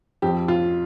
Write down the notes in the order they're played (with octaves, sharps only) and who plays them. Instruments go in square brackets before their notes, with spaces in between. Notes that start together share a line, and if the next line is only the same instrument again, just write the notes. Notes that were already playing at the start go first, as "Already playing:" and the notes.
[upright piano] F2 G4
F4